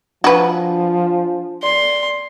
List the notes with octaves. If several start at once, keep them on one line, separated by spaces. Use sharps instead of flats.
F3 D4 F#4 B4
D5 C6